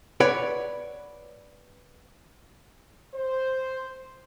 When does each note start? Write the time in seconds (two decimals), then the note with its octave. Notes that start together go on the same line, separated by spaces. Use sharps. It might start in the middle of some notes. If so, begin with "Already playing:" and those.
0.20 B4 C#5 D5 F#5
3.14 C5